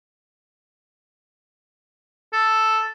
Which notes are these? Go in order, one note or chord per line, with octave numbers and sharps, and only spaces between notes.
A4